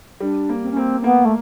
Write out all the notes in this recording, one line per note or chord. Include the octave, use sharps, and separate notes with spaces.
G3 D4
A#3
C4
C#4
A#3 C4
C4
A#3 B3
A3